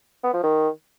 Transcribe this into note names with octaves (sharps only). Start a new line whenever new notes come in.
B3
F3
D#3